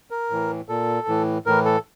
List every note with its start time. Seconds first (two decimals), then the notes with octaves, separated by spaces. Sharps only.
0.11 A#4
0.30 A2 E3
0.69 A#2 A4
1.08 A2 E3
1.46 A2 E3 A#4
1.65 A4